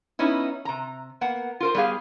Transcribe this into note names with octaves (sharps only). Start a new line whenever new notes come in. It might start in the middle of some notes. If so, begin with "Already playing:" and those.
B3 C#4 D#4 E4
C3 A#5
A#3 B3 F#5
F4 A#4 C5
G3 B3 G4 G#4 F5